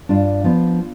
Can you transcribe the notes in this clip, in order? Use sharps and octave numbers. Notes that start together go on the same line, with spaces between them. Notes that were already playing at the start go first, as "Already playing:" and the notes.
G2 D4 F4
F3 B3